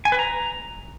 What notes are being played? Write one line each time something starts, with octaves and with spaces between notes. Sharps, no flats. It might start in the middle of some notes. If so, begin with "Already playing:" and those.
G#5
B4
A#5